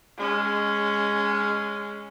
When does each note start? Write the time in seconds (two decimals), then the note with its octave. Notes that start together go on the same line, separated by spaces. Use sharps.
0.18 G#3 C#4